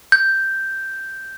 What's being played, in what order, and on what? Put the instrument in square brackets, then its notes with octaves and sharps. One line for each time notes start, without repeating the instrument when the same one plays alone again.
[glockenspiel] G6